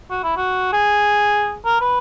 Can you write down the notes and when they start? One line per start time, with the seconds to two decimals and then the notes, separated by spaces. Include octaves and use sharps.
0.11 F#4
0.24 E4
0.37 F#4
0.73 G#4
1.65 A#4
1.81 B4